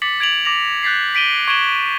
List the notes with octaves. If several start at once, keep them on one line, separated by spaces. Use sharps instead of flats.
D6 A6 B6 C#7 F#7
G#6 D7 F7 F#7
D6 A6 A#6 F7
F#6 G6 A6 B6 C7
B6 D7 D#7 G7
C#6 G#6 D7 E7 F#7 G7